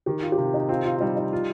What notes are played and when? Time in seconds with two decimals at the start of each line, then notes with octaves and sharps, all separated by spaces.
0.06 D#3 G4
0.23 F4
0.32 G4
0.38 C3 F4
0.54 D#4
0.69 C4 F4
0.85 F4
0.96 F4
1.00 G3 D#4
1.16 D#4
1.33 F4